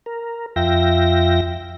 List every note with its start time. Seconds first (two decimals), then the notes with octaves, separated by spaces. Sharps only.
0.06 A#4
0.56 F2 F4 E5 G5 A#6